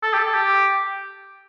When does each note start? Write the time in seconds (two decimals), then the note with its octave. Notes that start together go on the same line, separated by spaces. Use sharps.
0.03 A4
0.14 G4
0.19 A4
0.34 G4